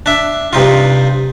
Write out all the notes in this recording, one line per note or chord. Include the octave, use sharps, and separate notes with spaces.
D4 E5
G2 C3 D#4 F4